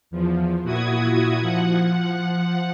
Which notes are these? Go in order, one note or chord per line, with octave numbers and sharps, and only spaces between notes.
E2 F3
A#2 E4 F#4 D#6 G#6
F3 F#5